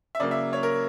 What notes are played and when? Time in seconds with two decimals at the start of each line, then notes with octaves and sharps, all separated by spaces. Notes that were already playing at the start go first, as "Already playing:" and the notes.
0.15 E5
0.20 C#3 F#3 A#3 D5
0.31 E5
0.53 C#5
0.63 A#4